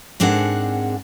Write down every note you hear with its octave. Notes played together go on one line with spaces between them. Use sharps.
G#2 C4 D4 G#4 A#4 F#5